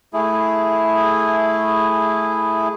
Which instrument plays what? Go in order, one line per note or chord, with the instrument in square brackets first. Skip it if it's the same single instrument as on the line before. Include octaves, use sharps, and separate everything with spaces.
[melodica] A3 E4 G#4